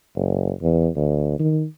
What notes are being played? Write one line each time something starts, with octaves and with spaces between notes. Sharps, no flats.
F#1
E2
D2
D#3